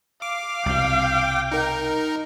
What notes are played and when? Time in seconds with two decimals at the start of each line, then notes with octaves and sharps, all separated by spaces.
0.22 F5 D6
0.66 C2 B2 G5
1.52 D#4 A#4